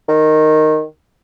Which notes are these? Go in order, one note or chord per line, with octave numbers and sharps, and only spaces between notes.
D#3